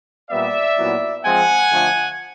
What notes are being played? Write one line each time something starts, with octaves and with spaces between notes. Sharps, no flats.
A#2 G3 B3 D5 E5
A#2 F#3 B3 E4
F3 G#3 C4 F#5 G#5
D3 F3 A3